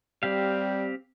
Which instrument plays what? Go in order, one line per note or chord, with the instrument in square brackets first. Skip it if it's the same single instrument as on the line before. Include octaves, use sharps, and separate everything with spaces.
[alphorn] G3 [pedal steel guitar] C4 G4 F5